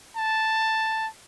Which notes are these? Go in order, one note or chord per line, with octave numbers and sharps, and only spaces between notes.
A5